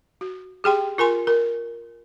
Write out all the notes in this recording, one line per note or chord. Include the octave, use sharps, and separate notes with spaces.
F#4
G4 G#4 G5 C6
F4 A#4 G#5 C6
A#4